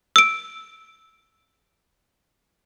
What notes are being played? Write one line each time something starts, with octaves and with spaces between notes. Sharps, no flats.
E6 D7